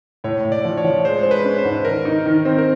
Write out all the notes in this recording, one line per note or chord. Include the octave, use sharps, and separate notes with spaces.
A2 C#5
A2
D5
F3
C#5
F3
G#3 C5
G#3 C5
B4
C#4
C5
G#2
D#3 A#4
D#4
D#3
C4
A#4